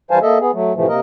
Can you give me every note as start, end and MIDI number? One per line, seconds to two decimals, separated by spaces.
0.11 0.19 52
0.11 0.19 55
0.11 0.19 72
0.11 0.19 77
0.11 0.19 80
0.11 0.19 81
0.22 0.38 58
0.22 0.38 69
0.22 0.38 75
0.22 0.38 76
0.40 0.51 59
0.40 0.51 68
0.53 0.73 54
0.53 0.73 57
0.75 0.87 45
0.75 0.87 48
0.75 0.87 52
0.75 0.87 53
0.75 0.87 57
0.88 1.00 48
0.88 1.00 58
0.88 1.00 70
0.88 1.00 75